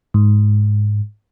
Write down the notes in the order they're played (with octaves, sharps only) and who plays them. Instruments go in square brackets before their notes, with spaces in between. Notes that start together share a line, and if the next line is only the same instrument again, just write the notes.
[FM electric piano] G#2